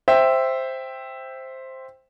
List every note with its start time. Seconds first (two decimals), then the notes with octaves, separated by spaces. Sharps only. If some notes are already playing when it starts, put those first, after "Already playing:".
0.08 C5 E5 G5